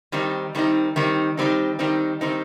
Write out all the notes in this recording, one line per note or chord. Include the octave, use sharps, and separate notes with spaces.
D#3 G3 C4 D#4
D#3 G3 C4 D#4
D#3 G3 C4 D#4
D#3 G3 C4 D#4
D#3 G3 C4 D#4
D#3 G3 C4 D#4